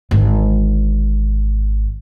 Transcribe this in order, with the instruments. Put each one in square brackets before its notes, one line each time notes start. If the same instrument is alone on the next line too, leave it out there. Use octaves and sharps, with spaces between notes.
[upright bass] G#1 D3